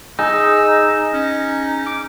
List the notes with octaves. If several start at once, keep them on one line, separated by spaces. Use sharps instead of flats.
D#4 G#4 E6
C#4
D6